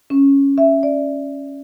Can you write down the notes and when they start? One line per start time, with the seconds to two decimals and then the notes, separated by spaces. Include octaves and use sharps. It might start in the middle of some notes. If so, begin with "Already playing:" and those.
0.10 C#4
0.58 E5
0.83 D5